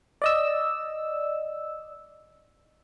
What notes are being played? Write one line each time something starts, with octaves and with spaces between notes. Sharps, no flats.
D5 D#5 E6